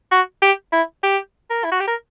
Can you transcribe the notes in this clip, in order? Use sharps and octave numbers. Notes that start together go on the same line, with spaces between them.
F#4
G4
E4
G4
A#4
E4
F#4
G4
A#4